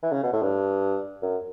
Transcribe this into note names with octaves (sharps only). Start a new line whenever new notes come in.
E3
C#3
B2
A2
G2
F#2